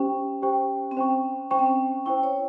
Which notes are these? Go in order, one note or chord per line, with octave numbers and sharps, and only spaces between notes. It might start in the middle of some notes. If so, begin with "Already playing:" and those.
Already playing: C#4 G4 C5 G5 C#6
G4 C5 G5 C#6
C4
C#4 C5 G5 C#6
C#4 C5 G5 C#6
C4
C#4
E4 C5 G5 C#6
C#5